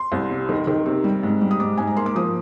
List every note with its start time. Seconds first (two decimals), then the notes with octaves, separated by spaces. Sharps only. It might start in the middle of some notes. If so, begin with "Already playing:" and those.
Already playing: C6
0.12 C2
0.30 C3
0.49 D#3
0.67 D#3
0.86 C3
1.04 G3
1.23 G#2
1.42 G3
1.51 D#6
1.60 G#2 D6
1.78 G#2 G#5
1.87 A#5
1.97 A#3 C6
2.06 D6
2.15 F3 D#6